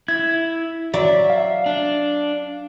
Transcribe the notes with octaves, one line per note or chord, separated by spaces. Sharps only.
E4 G#6
F#3 D5 E5
F5
D4